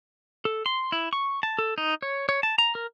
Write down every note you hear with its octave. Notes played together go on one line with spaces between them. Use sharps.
A4
C6
E4
C#6
A5
A4
D#4
C#5
C#5
A5
A#5
A#4